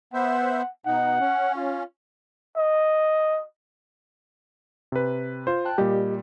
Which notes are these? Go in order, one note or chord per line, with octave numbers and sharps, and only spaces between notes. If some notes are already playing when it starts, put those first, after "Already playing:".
B3 C5 E5 F#5
B2 D#4 F#5
C#4
F4
D#5
C3 B4
F4 C5
G5 A5 F#6
A#2 G3 G4 D#5